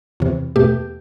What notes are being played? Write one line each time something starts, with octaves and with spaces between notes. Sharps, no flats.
E2 C3 E3
E2 B2 A3 G4